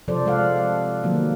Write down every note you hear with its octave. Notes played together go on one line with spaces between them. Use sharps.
C3 F3 A4 C5 D5
C3 G#3 A4 D5 F5 F#5
D#3 F#3 A#3